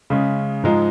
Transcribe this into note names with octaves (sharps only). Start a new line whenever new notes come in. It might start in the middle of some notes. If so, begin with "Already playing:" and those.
C#3 G#3 C#4
G#2 F3 G#3 D#4